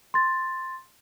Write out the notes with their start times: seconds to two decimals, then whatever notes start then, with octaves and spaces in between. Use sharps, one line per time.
0.14 C6 A6